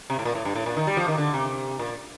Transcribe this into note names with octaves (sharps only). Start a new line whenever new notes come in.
C3
A2
A#2
A2
G2
A2
A#2
D#3
G3
F3
D#3
D3
C3
A#2